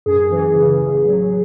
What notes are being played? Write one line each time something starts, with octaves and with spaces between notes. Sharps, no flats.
F#2 G#4
E3
C#3
A1
F#3